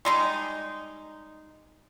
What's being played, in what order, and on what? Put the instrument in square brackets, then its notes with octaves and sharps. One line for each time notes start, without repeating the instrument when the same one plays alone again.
[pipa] G3 G#3 D#4